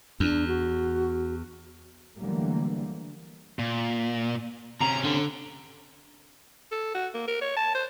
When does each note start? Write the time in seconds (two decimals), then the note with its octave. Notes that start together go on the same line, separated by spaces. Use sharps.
0.20 E2 D4
0.48 F#4
2.19 D3 E3 F#3 G3 A3 A#3
3.59 A#2
4.81 C3 C#4 A#5
5.05 D3
6.71 A4
6.94 F#4
7.14 A#3
7.27 A#4
7.41 C#5
7.57 A5
7.74 C5